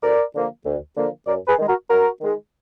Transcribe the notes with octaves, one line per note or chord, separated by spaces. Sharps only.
D2 A#4 D5
D3 F3 A#3
D2
D3 F3 A#3
F#2 A#4 D5
G#4 B4
D#3 G#3
F#4 A#4
F#2 F#4 A#4
D#3 G#3